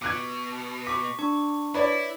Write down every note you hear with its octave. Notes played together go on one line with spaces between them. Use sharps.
B2 D6 F#6 G#6
C#6 D6 B6
D4 C#6
E4 B4 C#5 D5